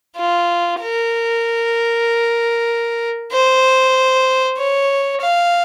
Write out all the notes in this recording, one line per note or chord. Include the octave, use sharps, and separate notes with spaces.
F4
A#4
C5
C#5
F5